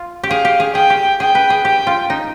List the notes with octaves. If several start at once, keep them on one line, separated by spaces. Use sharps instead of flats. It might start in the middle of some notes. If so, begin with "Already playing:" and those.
Already playing: F4
G4
G#4 F5
G4
G#4
G#4 G5
G4
G#4 G5
B4
G#4
G4 G5
F4
D#4